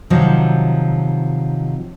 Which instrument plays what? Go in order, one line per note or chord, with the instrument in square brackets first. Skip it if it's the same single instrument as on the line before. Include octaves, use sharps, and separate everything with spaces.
[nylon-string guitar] C3 D#3 F3 F#3